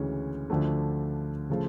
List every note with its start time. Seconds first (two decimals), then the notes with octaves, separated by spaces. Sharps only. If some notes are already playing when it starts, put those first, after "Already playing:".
Already playing: D2 C#3 E3 G#3 C#4
0.50 D2 D3 F3 A3
1.50 C#3 F3 A3